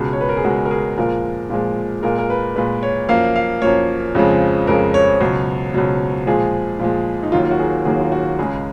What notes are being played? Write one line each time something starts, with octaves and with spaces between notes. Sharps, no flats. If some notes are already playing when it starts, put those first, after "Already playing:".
Already playing: C#2 B2 G#3
C#5
B4
A#4
G#4
C#2 B2 G#3 F#4
A#4
G#4
A#2 F3 G#3 A#4
A#2 F3 G#3
A#2 G#3 A#4
A#4
B4
A#2 G#3 B4
C#5
F#2 F3 A#3 F5
F5
F#2 F3 A#3 C#5
F2 C#3 F3 G#3
F2 C#3 F3 G#3 A#4
C#5
C#2 B2 F#3
C#2 B2 F#3
A#2 F3 G#3 G#4
A#2 F3 G#3
D#4
D#2 D#3 F#3 A#3 F4
F4
F#4
G#4
D#2 D#3 F#3 A#3 G#4
F4
F#4
C#2 C#3 G#3 G#4